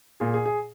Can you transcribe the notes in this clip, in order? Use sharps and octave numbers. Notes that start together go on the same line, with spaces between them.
A#2 G#4
G#4
G#4